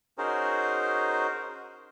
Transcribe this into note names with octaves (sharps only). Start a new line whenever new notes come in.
C#4 D#4 F#4 G#4 A#4 C5